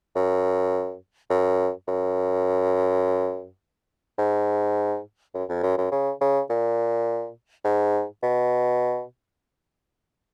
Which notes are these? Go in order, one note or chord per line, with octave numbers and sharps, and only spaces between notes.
F#2
F#2
F#2
G#2
F#2
F2
F#2
F#2
C#3
C#3
A#2
G#2
B2